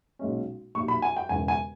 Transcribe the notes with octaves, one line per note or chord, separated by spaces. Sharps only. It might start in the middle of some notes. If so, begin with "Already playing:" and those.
B1 A#2 G#3 C#4
B1 A#2 G3 C#6
B5
G#5
G5
E1 E2 C#3 G#5
G#5